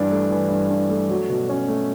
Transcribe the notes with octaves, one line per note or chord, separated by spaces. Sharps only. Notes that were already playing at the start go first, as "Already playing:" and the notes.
Already playing: G2 E3 D4
A3
E3
G2
D4
A3
F#3
B2
C#4
A3